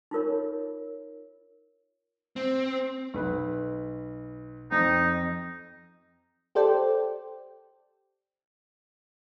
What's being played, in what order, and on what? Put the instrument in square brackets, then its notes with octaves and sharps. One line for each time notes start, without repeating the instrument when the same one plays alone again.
[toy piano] D#4 F4 A#4 C#5
[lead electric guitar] C4
[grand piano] B1 B4
[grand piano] F2 C4 [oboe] D#4
[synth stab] G4 A4 C5 D5 G5